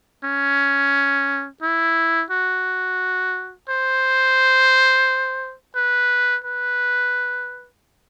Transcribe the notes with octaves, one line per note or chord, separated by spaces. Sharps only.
C#4
E4
F#4
C5
B4
B4